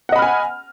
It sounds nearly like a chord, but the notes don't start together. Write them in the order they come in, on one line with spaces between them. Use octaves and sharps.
F#5 D#5 B5 F6 G#5